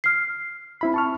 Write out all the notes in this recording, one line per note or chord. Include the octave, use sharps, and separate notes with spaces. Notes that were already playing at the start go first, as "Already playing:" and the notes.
F6 C7
C4 E4 B5
A5 C#6 F6